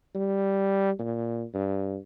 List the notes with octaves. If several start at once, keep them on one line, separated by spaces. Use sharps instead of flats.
G3
A#2
G2